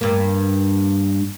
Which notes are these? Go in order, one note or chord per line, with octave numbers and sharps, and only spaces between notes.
G2 A#3